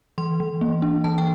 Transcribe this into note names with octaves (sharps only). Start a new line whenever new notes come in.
E3 C6
E3
A#3
D4
E3 A5
G5